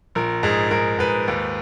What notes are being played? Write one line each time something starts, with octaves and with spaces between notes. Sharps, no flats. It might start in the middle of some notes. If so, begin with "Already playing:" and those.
A#1 A#4
G#2 G#4
G#2 A#4
G#2 B4
D#2